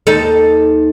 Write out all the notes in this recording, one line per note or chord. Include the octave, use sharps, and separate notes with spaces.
D#2 D#4 A4